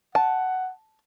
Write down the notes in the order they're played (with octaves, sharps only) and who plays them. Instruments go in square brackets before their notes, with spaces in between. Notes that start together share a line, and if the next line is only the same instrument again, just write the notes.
[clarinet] F#5 [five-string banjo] A5